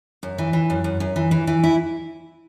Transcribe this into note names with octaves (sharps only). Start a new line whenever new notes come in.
F#2
E3
E3
F#2
F#2
F#2
E3
E3
E3
E4